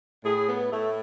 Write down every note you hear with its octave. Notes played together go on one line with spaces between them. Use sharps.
A2 G#4
B3
A2 A3